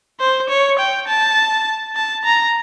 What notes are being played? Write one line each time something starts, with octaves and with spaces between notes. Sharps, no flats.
C5
C#5
G5
A5
A5
A#5